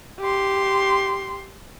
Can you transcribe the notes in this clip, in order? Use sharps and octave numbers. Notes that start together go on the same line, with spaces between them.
G4 C6